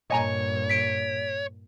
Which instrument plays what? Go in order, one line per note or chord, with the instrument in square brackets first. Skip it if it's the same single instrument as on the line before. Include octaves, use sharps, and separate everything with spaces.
[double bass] G2 A#2 [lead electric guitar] C#5 [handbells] D#5 G#5 A#5
[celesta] B6 D7